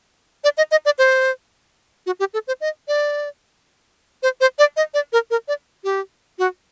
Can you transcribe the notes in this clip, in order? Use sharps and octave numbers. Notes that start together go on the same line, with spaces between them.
D5
D#5
D#5
D5
C5
F#4
G4
A4
C5
D#5
D5
C5
C5
D5
D#5
D5
A#4
A#4
D5
G4
F#4